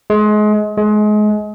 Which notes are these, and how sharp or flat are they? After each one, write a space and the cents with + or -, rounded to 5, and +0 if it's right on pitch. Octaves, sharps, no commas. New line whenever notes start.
G#3 +30
G#3 +30